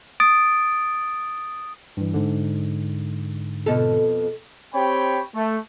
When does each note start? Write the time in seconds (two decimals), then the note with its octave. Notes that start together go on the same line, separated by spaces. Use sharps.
0.20 D#6 A6 D7
1.97 G2 E3
2.14 G#2 D3
3.66 F2 B2 A4
4.75 C4 G4 C#5 G5 B5
5.35 A3